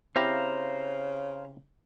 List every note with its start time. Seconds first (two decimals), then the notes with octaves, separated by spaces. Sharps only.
0.16 C#3 C4 E4 G4 C5 F5 A#5